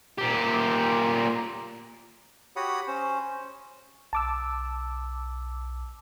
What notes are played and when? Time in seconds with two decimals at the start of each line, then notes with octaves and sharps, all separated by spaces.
0.18 A#2 G4
2.56 F#4 G4 C#5 F#5 B5 D#6
2.87 C#4 C5
4.13 B1 A5 D6 E6